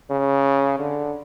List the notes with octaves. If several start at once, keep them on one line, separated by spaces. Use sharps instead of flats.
C#3
D3